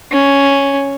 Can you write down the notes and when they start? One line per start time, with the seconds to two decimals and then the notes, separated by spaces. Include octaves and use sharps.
0.12 C#4